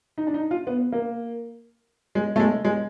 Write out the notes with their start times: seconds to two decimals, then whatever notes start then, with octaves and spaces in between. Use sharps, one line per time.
0.18 D#4
0.27 D4
0.34 D#4
0.51 F4
0.67 B3
0.92 A#3
2.15 G#3
2.36 A3
2.40 G#3
2.65 G#3